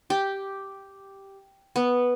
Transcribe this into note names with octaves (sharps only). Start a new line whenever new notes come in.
G4
B3